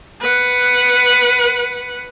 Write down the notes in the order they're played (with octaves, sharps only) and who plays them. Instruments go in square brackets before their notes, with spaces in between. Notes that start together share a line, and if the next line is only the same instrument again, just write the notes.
[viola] B4 F#5